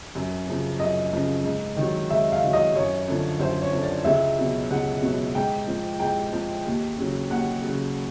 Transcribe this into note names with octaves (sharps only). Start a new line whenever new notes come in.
F#2
C#3 F3
F#2 D#5
C#3 F3
G#2
D#3 F#3
G#2 E5
F5
D#3 F#3
D#5
F#2 C#5
D3 F3
F#2 C5
C#5
D3 F3
D5
C#2 E5
B2 F#3
C#2 F#5
B2 F#3
G#2 G5
F3
G#2 G5
F3
D#2
C#3 F#3
D#2 F#5
C#3 F#3